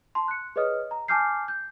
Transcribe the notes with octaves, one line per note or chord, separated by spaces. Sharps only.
A5 C6
F#6 C#7
G#4 B4 C#5 D#5 D#6 F6
A#5
G#5 A5 D6 F6 G6 C7
G6